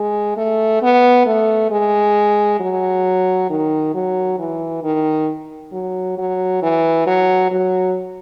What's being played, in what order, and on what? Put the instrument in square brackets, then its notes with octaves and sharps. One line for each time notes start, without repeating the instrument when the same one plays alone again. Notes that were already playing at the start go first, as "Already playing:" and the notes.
Already playing: [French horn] G#3
A3
B3
A3
G#3
F#3
D#3
F#3
E3
D#3
F#3
F#3
E3
F#3
F#3